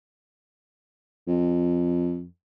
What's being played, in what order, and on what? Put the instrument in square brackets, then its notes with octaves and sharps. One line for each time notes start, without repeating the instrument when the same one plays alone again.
[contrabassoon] F2